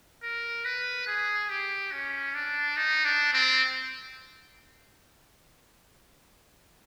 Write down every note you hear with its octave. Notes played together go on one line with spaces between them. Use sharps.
A#4
B4
G#4
G4
C#4
D4
D#4
D4
C4